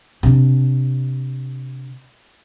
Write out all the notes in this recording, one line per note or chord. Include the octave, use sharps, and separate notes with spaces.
C3 D4